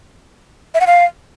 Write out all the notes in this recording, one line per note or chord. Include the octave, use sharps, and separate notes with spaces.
E5
F#5
F5